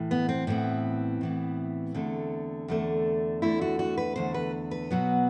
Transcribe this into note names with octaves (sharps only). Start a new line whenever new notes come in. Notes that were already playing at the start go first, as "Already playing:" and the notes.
Already playing: A2 E3
B3
C4
A2 E3 B3 C4
A2 E3 B3
E2 D3 A3
E2 D3 A3
E2 D3 A3 E4
F#4
F#4
B4
E2 D3 A3 C5
B4
B4
B2 F#3 B3